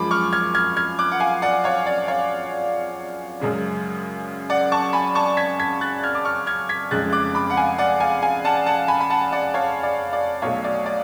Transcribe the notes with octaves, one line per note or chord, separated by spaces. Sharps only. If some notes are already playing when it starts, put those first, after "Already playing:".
Already playing: F#2 F3 G#3 B5 D6
C#6 F6
F6 G#6
F6 G#6
F6 G#6
D6 F#6
F#5
F5 G#5
D5 F#5
C#5 F5
D5
C#5 F5
F#2 C#3 G#3 C#4
D5 F#5
A5 C#6
G#5 B5
A5 C#6
G#6 B6
G#6 B6
F#6 A6
F6 G#6
D6
C#6 F6
F6 G#6
G#6 B6
F1 F2 C#3 G#3 F#6 A6
D6 F#6
B5 D6
F#5
F5 G#5
D5 F#5
F5 G#5
F5 G#5
F#5 A5
F#5 A5
G#5 B5
B5
F#5 A5
D5 F#5
C#5 F5
D5
D5
B1 B2 A3 C#5 F5
D5
D5